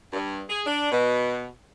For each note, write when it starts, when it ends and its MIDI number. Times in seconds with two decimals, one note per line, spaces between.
0.13 0.43 43
0.49 0.61 68
0.67 0.92 62
0.92 1.48 47